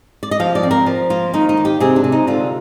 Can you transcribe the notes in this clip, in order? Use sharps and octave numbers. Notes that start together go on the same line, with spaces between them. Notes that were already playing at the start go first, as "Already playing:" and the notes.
D5
D#5
F3 F5
D5
C4
A#4
F3
A#3 F4
D#3 D#4
D#4
A#3
G4
C3 G#4
D4
C3
D#4
D3 F4